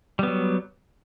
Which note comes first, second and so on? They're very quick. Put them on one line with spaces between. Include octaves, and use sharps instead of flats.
G3 B3 F#3